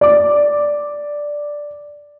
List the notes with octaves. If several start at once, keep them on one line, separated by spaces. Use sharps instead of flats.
D5 D6